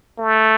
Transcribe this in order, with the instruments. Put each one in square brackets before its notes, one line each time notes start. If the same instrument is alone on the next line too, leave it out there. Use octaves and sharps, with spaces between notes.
[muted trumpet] A3